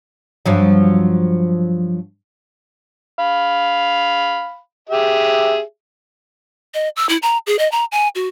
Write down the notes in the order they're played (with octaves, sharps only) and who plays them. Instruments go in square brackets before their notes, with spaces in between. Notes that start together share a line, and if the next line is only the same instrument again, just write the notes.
[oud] G2 F3 F#3
[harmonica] F5 B5
G4 G#4 E5
[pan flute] D#5
E6
E4
A#5
G#4
D#5
A#5
G#5
F#4